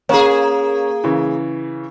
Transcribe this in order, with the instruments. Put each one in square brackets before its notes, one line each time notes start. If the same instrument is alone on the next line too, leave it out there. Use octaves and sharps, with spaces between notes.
[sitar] A#3 G#4 [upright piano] C#4
[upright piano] C#3 E3